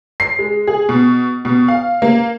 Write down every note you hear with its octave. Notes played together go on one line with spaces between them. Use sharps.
C7
G#3
G#4
B2
B2
F5
A#3